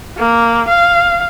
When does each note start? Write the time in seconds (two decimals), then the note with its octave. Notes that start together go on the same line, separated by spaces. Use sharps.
0.17 A#3
0.69 F5